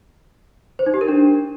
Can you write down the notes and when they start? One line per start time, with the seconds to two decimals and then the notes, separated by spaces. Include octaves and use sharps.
0.79 C5
0.86 D#4
0.94 G4
1.01 A#4
1.08 D4